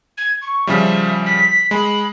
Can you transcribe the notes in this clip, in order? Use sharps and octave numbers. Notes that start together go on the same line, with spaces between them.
G#6
C#6
C#3 F3 G3 E5
B6
G#3 B5